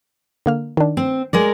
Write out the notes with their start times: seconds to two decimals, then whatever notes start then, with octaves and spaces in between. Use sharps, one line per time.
0.46 D3 A#3 F6
0.77 D#3 D4
0.97 C4
1.33 G#3 A#4 D5